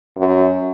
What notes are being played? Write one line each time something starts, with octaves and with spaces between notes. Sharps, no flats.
F#2